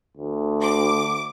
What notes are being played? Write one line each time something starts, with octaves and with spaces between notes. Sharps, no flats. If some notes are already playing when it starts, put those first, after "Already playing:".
D2
D6